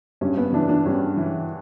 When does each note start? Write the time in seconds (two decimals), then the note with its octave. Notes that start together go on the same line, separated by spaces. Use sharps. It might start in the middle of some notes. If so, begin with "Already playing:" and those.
0.21 G2 C#4
0.37 B3
0.53 E3 D4
0.69 D4
0.85 G2 C#4
1.17 E3